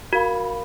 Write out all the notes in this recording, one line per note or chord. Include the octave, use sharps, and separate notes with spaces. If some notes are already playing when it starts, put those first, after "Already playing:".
F#4 A#4 F5 B5